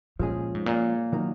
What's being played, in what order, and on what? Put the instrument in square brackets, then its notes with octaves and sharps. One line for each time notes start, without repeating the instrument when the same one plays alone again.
[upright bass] A#2 [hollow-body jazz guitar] F3 G#3 C#4 G#4
[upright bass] G#2
A#2
[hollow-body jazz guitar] D#3 F#3 A#3 D#4